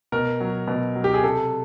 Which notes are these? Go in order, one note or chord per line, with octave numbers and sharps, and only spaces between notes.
B2 A#4
F#3
B2
F#3
G4
G#4
C3 A4